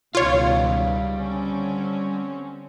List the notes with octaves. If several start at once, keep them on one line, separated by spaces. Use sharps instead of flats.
C#2 B2 D#3 G3 F4 C#5 F5
D3 C4 C#4